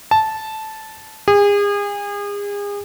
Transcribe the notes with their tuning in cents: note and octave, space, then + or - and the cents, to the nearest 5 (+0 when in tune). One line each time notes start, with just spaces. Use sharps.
A5 -10
G#4 -35